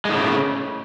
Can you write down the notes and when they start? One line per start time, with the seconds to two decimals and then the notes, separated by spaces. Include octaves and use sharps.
0.05 G#3
0.09 A2
0.14 C#3